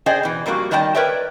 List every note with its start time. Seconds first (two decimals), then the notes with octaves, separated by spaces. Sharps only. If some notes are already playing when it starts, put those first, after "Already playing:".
0.06 G#4 C5 D5 D#5 G5 G#5
0.23 B2 E3
0.46 F2 G3 A#3 D4 F#4
0.71 D#3 G3 D5 D#5 G5 A5
0.95 A#4 B4 C#5 D5 E5 G5